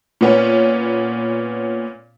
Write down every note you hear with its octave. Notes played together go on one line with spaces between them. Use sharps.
A#2 B3 C#4